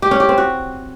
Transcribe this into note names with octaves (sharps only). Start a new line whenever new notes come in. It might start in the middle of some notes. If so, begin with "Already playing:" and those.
G4
C#4
G4
C4
F#4